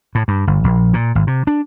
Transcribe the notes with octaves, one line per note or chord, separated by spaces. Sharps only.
A2
G2
G1
A#1
A#2
G#1
C3
D4